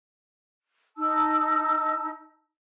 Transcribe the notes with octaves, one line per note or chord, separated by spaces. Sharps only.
D#4 A5 E6